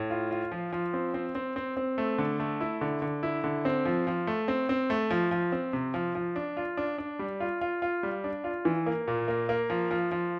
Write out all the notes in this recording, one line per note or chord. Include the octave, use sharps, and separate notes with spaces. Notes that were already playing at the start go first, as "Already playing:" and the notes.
Already playing: A2
F4
F4
F3
F3
C4
C4
C4
C4
C4
A3
D3
A3
E4
D3
D3
E4
D3
C4
F3
F3
A3
C4
C4
A3
F3
F3
C4
C3
F3
F3
D4
F4
D4
D4
G3
F4
F4
F4
G3
D4
F4
E3
A#3
A#2
A#3
A#3
F3
F3
F3